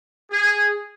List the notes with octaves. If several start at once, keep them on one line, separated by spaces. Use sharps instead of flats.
G#4